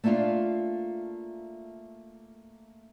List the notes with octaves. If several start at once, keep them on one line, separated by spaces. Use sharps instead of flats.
A3 A#3 D4 F4 F5